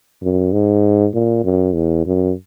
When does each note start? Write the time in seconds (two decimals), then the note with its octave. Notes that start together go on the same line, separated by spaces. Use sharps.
0.22 F#2
0.53 G#2
1.14 A#2
1.44 F#2
1.75 E2
2.06 F#2